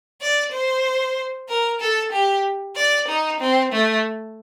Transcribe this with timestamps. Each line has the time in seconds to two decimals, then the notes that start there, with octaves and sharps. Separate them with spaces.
0.21 D5
0.52 C5
1.49 A#4
1.81 A4
2.12 G4
2.76 D5
3.08 D#4
3.40 C4
3.72 A3